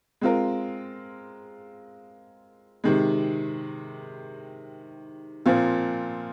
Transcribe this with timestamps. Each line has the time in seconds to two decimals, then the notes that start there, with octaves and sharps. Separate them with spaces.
0.21 G#3 C4 F4 A#4
2.84 C3 D#3 G#3
5.46 A#2 F3 C4 F4